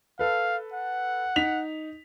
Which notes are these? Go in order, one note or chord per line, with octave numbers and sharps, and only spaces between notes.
A4 B4 F5
F#5
D#4 B6 F7